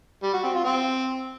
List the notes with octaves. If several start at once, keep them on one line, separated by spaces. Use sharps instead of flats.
G3
F#4
C4
F4
C4